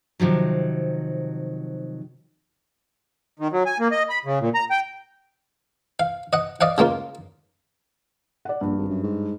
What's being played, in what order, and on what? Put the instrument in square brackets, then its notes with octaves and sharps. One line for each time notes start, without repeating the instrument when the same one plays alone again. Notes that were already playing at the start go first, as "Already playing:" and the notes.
[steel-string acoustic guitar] C3 D#3 F3 F#3
[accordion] D#3
F#3
G#5
A#3
D#5
B5
C#3
A#2
A#5
G5
[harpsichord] F5
D#5 F#5
D5 D#5 F5 F#5
C#3 G#3 A#3 F4
[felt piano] D5 F#5
[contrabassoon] A#1 [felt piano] G2
[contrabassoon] G#1
F#2
G#2